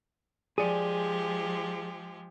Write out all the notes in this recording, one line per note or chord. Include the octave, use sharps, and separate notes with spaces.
F3 G#3 G4 G#4 D5